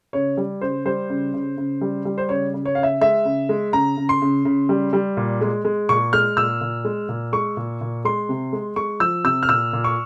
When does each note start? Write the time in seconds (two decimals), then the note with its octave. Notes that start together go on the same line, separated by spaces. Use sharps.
0.13 C#3 C#5
0.37 G3
0.61 C#3 C5
0.86 G3 C5
1.10 C#3
1.34 C#3
1.57 C#3
1.81 G3
2.05 G3
2.18 C5
2.29 C#3 C#5
2.54 C#3
2.65 C#5
2.75 C#3 F5
2.83 E5
3.01 G#3 E5
3.25 C#3
3.49 G#3
3.73 C#3 A#5
3.97 C#3
4.09 C6
4.22 C#3
4.45 C#3
4.69 G3
4.93 G3
5.17 A#2
5.41 G#3
5.65 G#3
5.89 A#2 C#6
6.13 G#3 F6
6.37 A#2 E6
6.61 A#2
6.85 G#3
7.09 A#2
7.33 G#3 C#6
7.57 A#2
7.81 A#2
8.05 G#3 C6
8.29 C3
8.53 G#3
8.76 G#3 C#6
9.00 F3 E6
9.24 C3 E6
9.43 F6
9.49 A#2 E6
9.73 A#2
9.84 C#6